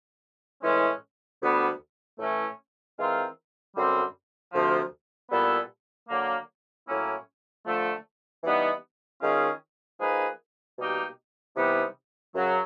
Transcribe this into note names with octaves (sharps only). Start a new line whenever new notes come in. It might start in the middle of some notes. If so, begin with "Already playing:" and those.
A2 E3 G#3 C#4
D2 D3 G3 B3
A2 E3 A3 C#4
E3 G#3 C4 F4 A#4
F#2 D3 G3 C4
D2 C3 F3
A#2 G3 B3 E4 A4
D3 F#3 A#3
A2 F#3 A#3 C#4 E4
D3 F3 A3
E3 G3 B3 D#4
D#3 G#3 C#4 F4 G#4
F3 A#3 D#4 G#4 B4
B2 G3 A#3 D#4 G4
C3 E3 G3 B3 D#4
F#2 C#3 F#3